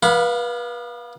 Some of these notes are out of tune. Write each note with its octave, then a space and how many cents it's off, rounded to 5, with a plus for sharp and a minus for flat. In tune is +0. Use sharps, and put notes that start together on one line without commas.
B3 -35 F5 +0 B5 +0